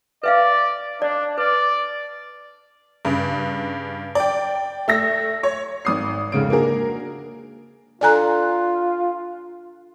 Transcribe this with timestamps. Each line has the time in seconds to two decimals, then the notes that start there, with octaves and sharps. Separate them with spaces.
0.23 B4 D5 E5 F5
1.02 D4 D5
1.38 B4 D5
3.05 G2 C#3
4.15 D5 G5
4.88 A3 E6 A#6
5.43 C#5
5.85 G#1 D#6 C7
6.32 F1 G#2 C#3 D7
6.50 A#3 D4 F#4 G#4 A#4
8.01 D4 F4 A4 D5 G#5 A#5 F#6